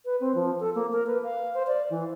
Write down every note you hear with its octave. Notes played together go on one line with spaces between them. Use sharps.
B4
C4
F3
A4
A#3
A#4
B4
F5
C5
D5
E3